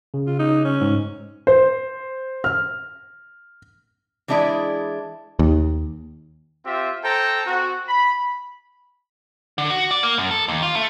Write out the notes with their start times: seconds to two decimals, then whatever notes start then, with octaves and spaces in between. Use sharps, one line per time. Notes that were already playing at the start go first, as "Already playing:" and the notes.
0.14 C#3
0.27 F4
0.39 D#4
0.65 C#4
0.81 G#2
1.47 C5
2.44 F6
4.28 E3 G#3 D4 E4 G#4 D5
5.39 D#2
6.65 C4 F4 G4 E5
7.04 A4 C5 G5 A5 A#5
7.46 C4 F#4
7.88 B5
9.58 D3
9.70 F#4
9.91 D5
10.03 A#3
10.18 F#2
10.31 A4
10.48 D#2
10.63 F4
10.75 A3